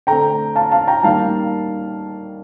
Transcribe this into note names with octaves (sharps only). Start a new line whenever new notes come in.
D3 A3 C4 G5 A#5
F5 A5
F5 A5
G5 A#5
D#3 G3 A#3 F5 A5